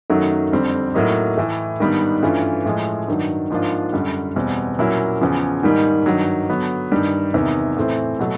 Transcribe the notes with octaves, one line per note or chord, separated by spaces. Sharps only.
F#2 D#3 F#3 A3
F2 D3 G3 C4
A2 F#3 A#3 D#4
A2 E3 A3
G#2 D#3 G3 B3 D4
G2 E3 A3 C#4 F4
A2 F3 G#3
G2 D#3 F#3
G#2 F3 A#3 D4 F4
F#2 D3 G3
E2 B2 G3 C4
A#2 F#3 A#3 C#4 E4
E2 C#3 F3
G#2 D#3 G3 A#3
G2 D#3 F#3
D3 F#3 B3
G2 D#3 G3
E2 C3 D#3
A2 E3 A3 C4
B2 F#3 A3